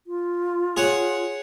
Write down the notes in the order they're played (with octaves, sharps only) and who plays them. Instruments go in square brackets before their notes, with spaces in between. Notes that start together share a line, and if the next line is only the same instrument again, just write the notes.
[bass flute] F4
[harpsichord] G#4 C#5 F#5